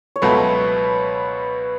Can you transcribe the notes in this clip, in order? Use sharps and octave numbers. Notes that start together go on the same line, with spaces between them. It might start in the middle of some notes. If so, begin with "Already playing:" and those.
C#5
C#2 B2 F#3 A3 B4